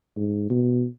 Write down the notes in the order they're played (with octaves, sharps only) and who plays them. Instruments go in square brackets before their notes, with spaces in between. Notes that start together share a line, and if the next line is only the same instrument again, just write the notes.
[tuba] G#2
B2